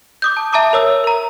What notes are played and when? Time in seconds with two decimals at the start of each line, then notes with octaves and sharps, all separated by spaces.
0.22 D6 D#6 G6
0.37 A5
0.53 E5 A5 A#5 D6 D#6
0.73 A#4 C#5 E6
1.04 A#4 A#5